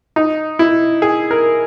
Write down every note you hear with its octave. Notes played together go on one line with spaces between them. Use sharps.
D#4
E4
G#4
A#4